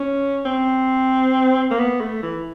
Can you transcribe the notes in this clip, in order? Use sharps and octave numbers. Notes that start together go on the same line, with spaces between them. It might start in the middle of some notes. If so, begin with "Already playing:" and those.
Already playing: C#4
C4
A#3
B3
A3
E3